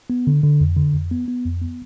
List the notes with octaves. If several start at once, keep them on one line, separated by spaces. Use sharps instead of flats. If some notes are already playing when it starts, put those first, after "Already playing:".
B3
D3
D3
F2
D3
F2
B3
B3
F2
B3